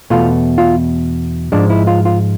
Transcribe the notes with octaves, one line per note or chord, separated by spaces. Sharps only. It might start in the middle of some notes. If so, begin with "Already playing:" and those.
E2 B2 A3 F4
F4
G#2 F3 G#3 D4
E4
F4
F4